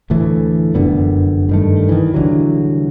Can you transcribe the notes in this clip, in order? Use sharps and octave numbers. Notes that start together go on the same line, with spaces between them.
D2 A2 E3 A3
F1 F#2 D3 B3
G2 D#3 A3
D#3 E3
C2 D3 E3 F#3